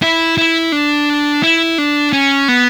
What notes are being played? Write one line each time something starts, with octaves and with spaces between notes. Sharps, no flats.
E4
E4
D4
E4
D4
C#4
B3